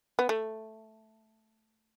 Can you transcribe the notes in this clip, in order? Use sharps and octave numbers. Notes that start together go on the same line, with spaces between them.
B3
A3